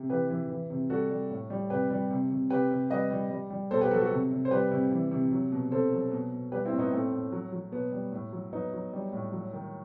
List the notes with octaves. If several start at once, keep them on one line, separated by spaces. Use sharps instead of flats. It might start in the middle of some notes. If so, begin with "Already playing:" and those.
Already playing: C3
E3 G4 B4
E3
E3
C3
G3 F#4 A4
G3
A2
G3
C3 G4 B4
G3
C3
C3
C3 G4 B4
C3
G3 B4 D#5
G3
G3
G3
B2 A4 C5
G4 B4
F#3 F#4 A4
F#4 A4
C3
C3
C5
G3 G4 B4
C3
E3
C3
F#3
B2
C3 A4 C5
F#3
B2
B2
G3 G4 B4
C4 E4
A2
B3 D#4
A2 A3 C4
A2
F#3
F#3
B2 B3
G3
A2
F#3
F#3 B3 D#4
F#3
G3
A2
F#3
D#3